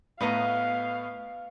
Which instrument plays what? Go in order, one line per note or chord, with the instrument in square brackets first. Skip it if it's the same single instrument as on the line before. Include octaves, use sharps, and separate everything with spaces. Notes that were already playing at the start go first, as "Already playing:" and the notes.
[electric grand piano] A2 A3 B3 [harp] B4 D#5 A#5 [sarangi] F5